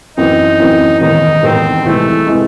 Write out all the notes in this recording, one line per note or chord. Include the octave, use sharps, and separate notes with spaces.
F#2 E3 C4 D#4
F#2 E3 C4
E1 D#2 D#3 D#4
E1 D#2 D#3 C4
C2 C3 E3 G#3 A3
C3 E3 G#3